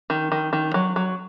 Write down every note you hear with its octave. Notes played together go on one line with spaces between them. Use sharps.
D#3
D#3
D#3
F#3
F#3